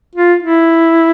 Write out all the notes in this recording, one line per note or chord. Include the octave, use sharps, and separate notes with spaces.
F4
E4